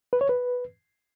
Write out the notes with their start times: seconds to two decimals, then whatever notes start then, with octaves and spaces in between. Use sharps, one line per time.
0.13 B4
0.21 C#5
0.29 B4